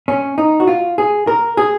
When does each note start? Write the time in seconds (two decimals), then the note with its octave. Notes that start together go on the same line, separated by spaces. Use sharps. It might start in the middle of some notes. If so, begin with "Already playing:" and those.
0.08 C#4
0.38 D#4
0.60 F#4
0.67 F4
0.98 G#4
1.27 A#4
1.57 G#4